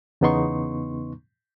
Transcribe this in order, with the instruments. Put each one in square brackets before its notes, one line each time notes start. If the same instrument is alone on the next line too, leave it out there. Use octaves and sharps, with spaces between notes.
[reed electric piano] E2 C#3 B3 D#4 C6 C#6